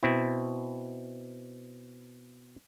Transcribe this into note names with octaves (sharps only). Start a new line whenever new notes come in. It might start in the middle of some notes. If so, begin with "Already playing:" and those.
B2 C4 E4